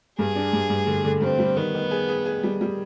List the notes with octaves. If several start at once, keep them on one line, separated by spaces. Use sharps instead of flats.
G2 G#4
D4
G2
G2
D3
D3
G2 C4
G3
D#3 B3
D#3
G#4
G#4
G#4
G3
G3